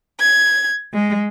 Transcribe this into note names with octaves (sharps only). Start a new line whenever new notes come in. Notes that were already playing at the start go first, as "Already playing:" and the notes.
G#6
G#3